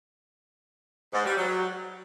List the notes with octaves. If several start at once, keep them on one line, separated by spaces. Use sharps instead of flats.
G#2
G3
F#3